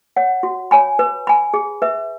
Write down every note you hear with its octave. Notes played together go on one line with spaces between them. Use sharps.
C#5 F#5
F#4
C#5 G#5 B5
B4
G#5 B5
G#4
B4 E5